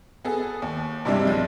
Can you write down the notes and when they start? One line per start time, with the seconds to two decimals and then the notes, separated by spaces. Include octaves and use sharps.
0.25 B3 G#4 A4
0.62 D#2
1.05 G2 C3 G3 G#3 D4 E4
1.25 B1 F3 G#3